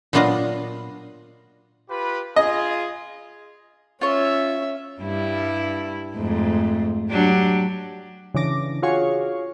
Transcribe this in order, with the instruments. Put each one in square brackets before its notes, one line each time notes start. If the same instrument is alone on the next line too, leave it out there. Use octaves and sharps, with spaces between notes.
[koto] A#2 F#3 B3 D4 F4 D#5
[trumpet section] F4 G4 B4
[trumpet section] F4 G#4 [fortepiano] D#5
[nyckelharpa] C#4 E5 [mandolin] F4 C#5
[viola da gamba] G2 G3 E4
F2 G#2 A3
F#3 D4 G4
[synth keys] C#3 E3 D4 D6 A#6
F4 F#4 G#4 C#5 F5 C#6